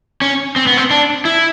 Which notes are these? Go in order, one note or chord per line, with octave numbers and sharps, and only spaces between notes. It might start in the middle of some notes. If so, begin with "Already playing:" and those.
C#4
C4
B3
C4
D4
E4